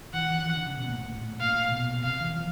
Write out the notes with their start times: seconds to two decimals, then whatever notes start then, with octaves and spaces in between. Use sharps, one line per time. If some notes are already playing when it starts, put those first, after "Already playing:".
0.14 E3 F#5
0.30 E3
0.46 E3
0.57 D3
0.67 C#3
0.77 B2
0.88 A#2
0.98 A2
1.08 A2
1.40 A#2 F5
1.72 B2
2.04 C3 F5
2.20 E3
2.36 F3